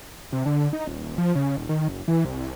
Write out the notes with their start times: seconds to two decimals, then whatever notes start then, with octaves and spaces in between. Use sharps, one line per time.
0.33 C3
0.46 D3
0.73 D#4
0.87 D#1
1.18 F3
1.35 C#3
1.57 D#1
1.69 D#3
1.88 F#1
2.08 E3
2.25 C2